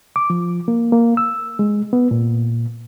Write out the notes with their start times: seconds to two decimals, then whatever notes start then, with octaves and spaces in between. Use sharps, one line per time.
0.16 D6
0.30 F3
0.68 A#3
0.92 A#3
1.17 E6
1.59 G#3
1.93 B3
2.11 A#2